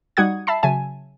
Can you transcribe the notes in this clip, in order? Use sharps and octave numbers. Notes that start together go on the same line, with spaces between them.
G3 D#4 F#4 F#5 D#6 G#6
E5 A5 B5 C7
C#3 F#3 E5 G#5 A5